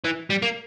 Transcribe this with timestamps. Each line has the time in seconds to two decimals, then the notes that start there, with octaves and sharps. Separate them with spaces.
0.04 E3
0.30 G3
0.42 A#3